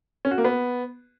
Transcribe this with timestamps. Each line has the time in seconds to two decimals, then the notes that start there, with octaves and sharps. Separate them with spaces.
0.25 C#4
0.31 F#4
0.38 A#3
0.44 B3